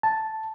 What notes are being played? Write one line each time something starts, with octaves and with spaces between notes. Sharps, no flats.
A5